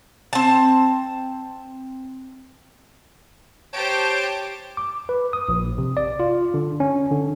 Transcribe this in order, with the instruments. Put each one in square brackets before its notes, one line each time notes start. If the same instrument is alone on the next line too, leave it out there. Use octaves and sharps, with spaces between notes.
[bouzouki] C4 A5
[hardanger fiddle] G4 C5 [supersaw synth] C#5 A5 D7
[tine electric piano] D6
B4
D#6
A#1
C3
D5
F4
D3
C#4
D3